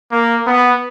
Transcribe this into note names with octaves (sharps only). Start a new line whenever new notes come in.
A#3
B3